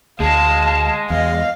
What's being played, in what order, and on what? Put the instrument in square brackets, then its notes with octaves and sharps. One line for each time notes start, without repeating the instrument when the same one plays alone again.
[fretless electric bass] D2 [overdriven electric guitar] G#3 [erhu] F5 [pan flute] A5
[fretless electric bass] E2 [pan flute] D#5 [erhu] F5